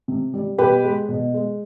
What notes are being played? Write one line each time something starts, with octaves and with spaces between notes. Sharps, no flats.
C3
G3
B2 G4 B4
G#3
B2
G#3